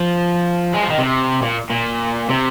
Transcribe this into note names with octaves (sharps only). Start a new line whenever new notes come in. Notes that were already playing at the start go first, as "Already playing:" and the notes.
Already playing: F3
G#3
F3
D#3
C3
A#2
A#2
C3